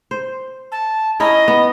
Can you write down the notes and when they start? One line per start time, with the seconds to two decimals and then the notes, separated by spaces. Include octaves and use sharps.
0.11 C5
0.72 A5
1.20 C#4 D#4 E4 D#5
1.48 B3